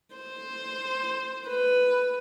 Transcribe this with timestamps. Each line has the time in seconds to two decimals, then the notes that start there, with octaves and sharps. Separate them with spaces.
0.15 C5
1.48 B4